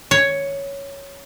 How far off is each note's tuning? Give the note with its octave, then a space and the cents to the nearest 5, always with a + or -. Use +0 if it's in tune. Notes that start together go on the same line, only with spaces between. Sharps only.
C#5 +5